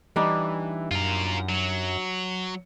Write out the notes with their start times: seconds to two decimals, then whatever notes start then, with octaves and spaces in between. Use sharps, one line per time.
0.16 E3 G3 D4 D#4
0.91 F#2 F4 A#4
1.49 F#3